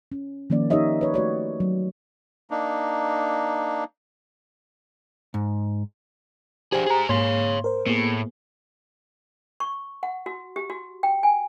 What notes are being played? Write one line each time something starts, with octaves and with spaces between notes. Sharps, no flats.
C#4
D#3 F3 A#3 C#4 D5
D#4 G4 A#4 C#5 D#5 E5
B4 C#5
A3 F#4 C#5 D5
F#3
A#3 D4 D#4
G#2
D4 G4 G#4 C5 G#5
G#4 A#5
G#2 A#3 C#5 F5 C6
A#4 C5
A2 A#3 B3 G#4
C#6
F#5
F#4
G4
F#4
G5
G#5